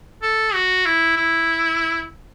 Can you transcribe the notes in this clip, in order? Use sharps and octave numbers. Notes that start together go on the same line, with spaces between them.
A4
F#4
E4
E4